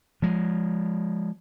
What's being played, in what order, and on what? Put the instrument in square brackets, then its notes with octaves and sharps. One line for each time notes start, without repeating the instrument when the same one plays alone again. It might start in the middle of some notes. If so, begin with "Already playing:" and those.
[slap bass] F3 G#3